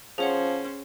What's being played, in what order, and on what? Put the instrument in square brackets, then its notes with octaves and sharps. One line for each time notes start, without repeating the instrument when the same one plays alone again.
[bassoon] F3 [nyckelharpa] C#4 C5 [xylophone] G#4 C#5 F#5